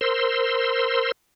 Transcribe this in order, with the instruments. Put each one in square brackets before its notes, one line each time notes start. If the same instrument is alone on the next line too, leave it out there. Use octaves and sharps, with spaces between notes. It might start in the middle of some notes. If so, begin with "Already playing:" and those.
[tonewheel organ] A#4 C5 C6 E6